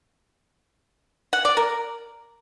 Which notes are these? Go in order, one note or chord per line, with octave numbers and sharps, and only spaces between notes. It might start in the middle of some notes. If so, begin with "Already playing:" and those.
F#5
D5
A#4